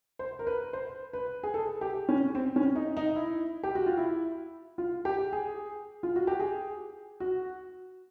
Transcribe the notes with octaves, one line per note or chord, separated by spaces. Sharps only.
C5
A#4
B4
C5
B4
G#4
A4
G4
C#4
C4
C#4
D#4
D#4
E4
G4
F#4
F4
E4
F4
G4
G#4
F4
F#4
G4
G#4
F#4